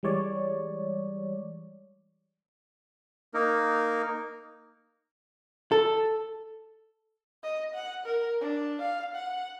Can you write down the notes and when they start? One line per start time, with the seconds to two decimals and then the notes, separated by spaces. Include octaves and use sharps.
0.03 E3 G3 G#3 C#5 D5
3.34 A#3 D#4 A#4
5.72 A4
7.44 D#5
7.74 F#5
8.06 A#4
8.41 D4
8.82 F5
9.15 F#5